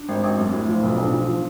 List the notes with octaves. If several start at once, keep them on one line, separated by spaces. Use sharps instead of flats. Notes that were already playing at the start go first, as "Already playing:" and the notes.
Already playing: D4
G#1
G#1
F#2
A2
F3
B1
B1 D4
F3
F3